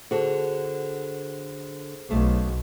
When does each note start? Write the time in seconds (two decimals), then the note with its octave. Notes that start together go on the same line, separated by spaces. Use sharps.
0.11 D3 F#4 G#4 A4 C5
2.10 B1 C#3 A3